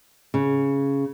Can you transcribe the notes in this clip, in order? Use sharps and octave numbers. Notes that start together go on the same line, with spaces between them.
C#3